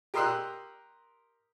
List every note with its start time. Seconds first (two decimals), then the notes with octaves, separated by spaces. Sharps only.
0.14 G4 A#4 D#5 C6 E6 F#6